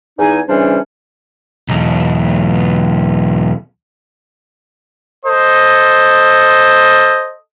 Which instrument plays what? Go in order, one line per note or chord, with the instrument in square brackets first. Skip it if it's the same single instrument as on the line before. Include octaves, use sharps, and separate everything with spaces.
[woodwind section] E2 D#4 G#5
C#3 E3 G3 C#4 D4 C5
[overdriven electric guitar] B1 E2
[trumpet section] A4 C5 D#5